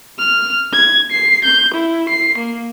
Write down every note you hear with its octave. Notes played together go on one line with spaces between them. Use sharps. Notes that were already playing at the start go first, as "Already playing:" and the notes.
F6
G#6
C7
G6
E4
C7
A#3